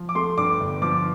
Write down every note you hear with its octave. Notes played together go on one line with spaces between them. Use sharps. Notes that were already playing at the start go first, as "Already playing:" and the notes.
Already playing: F3
D6
A3 C6
G2 D6
G1
F3 D6